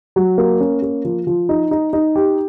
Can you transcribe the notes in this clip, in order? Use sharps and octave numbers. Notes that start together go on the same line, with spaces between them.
F#3
A#3
C#4
A#3
F3
F3
D#4
D#4
D#4
G4